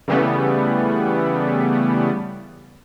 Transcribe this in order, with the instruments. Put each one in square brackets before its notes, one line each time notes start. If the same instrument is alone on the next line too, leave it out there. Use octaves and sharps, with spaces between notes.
[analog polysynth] C#3 E3 G3 A3 B3